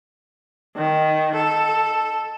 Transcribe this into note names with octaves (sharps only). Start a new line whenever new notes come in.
D#3
A4